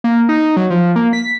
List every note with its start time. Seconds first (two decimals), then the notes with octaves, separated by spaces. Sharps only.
0.04 A#3
0.29 D#4
0.57 F#3
0.70 F3
0.96 A#3
1.13 B6